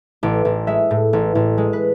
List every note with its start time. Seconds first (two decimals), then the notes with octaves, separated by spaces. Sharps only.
0.23 A1 D6
0.45 A1
0.67 G#3 E5
0.91 A2
1.13 A1
1.35 A1
1.58 G#3
1.73 B4